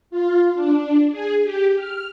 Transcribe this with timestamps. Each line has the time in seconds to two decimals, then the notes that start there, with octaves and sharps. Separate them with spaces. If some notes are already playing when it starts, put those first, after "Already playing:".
0.10 F4
0.54 D4
1.11 G#4
1.43 G4
1.76 F6